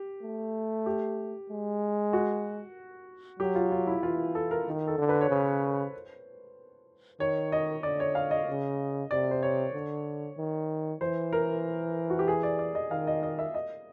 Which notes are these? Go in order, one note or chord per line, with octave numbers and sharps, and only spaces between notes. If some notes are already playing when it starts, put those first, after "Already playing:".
Already playing: G4
A3
G4
G#3
F#4
F#3 G4
F4
F4
E4
E3 F4
A4
A#4
D#3
A4
D3
B4
C#5
C#3 C5
D#3 C#5
D#5
D3 D5
C#5
F5
D#5
C#3
C3 D5
C5
C#5
D3
D#3
E3 C5
A#4
F#4
G4
G#4
D5
D5
D#5
D#3 F5
D#5
D#5
E5
D#5